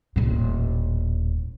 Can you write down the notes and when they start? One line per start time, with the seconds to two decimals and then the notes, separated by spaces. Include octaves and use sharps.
0.16 D#1 A2